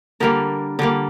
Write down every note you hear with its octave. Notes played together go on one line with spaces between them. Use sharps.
D3 G3 A#3 A#4
D3 G3 A#3